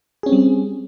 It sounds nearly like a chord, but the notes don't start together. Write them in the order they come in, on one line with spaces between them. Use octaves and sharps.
G#4 C#4 C4 G3